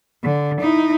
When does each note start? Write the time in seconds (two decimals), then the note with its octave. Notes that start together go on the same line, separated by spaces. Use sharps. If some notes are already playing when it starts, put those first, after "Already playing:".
0.24 D3
0.61 D#4 E4